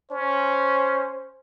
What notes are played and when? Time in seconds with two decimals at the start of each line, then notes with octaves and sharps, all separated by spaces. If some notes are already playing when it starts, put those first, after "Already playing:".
0.11 C#4 C5